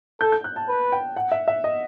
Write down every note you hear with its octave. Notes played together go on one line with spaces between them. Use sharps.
A4 G6
G6
F#6
A5
B4
G5
F#5
E5
E5
D#5